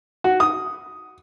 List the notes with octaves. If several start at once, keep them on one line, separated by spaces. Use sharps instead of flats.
F#4
D#6